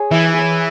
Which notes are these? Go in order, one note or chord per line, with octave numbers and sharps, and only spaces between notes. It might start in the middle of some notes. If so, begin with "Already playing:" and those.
Already playing: G#4 C#5
E3 E4
G#4 C#5